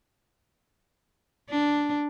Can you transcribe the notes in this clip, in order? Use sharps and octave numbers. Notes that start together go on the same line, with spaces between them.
D4